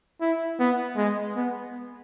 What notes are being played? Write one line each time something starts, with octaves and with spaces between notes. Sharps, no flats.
E4
B3
G#3
B3